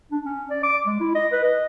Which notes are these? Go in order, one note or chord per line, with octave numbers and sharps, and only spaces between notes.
D4
C#4
D5
D6
G#3
E4
D#5
B4
D#5